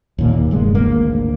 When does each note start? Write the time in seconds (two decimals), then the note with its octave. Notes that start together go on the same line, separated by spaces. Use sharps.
0.18 D#2 A#2 A#3
0.51 F1 G2 G#3 A#3
0.75 G#1 D2 A#3